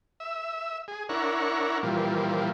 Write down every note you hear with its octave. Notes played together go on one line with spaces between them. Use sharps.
E5
G#4
D4 E4 A#4 C#5 F#5
A#2 E3 F3 G3